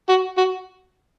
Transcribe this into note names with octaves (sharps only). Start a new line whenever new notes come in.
F#4
F#4